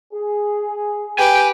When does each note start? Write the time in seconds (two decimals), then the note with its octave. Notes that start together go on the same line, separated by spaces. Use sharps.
0.13 G#4
1.18 G4 B4 G5 G#5